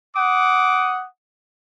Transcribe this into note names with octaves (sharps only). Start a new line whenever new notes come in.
F#5 D6 D#6